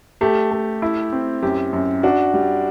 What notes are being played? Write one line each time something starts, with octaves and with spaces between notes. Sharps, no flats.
A3 G4
A3
E4
C4
F#2 G4
F#2
D4 F#4
G3